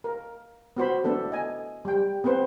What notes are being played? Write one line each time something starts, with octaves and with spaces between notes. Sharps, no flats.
A#4
B3 F#4 C5 B5
A3 B3 D4 A4
D#5 G#5
G3 G5
B3 C4 B4 C5